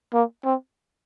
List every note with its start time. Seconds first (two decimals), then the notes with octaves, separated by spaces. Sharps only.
0.13 A#3
0.45 C4